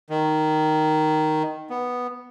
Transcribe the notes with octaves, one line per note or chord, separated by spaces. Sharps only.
D#3
B3